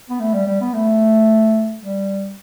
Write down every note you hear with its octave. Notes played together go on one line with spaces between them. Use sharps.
B3
A3
G3
G3
B3
A3
G3